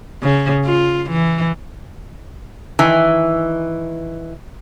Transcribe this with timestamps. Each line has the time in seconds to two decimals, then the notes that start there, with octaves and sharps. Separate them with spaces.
0.23 C#3
0.65 F4
1.10 E3
2.79 D#3 E3 G#5